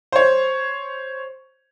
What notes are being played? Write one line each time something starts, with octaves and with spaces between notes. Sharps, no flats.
C5 C#5